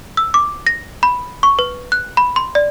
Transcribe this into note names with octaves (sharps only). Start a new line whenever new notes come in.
E6
D6
A#6
B5
C#6
B4
F#6
B5
C6
D5